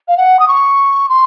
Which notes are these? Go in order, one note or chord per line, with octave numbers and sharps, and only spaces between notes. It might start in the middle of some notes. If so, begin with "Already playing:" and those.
F5
F#5
D#6
C#6
C6